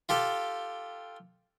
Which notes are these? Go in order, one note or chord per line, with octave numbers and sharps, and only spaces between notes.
F4 G4 A4